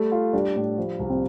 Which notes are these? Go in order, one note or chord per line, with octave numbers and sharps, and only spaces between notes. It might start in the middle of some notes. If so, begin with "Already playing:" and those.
Already playing: G3 A3
F4
G3 D4
A2
F3
C2
C4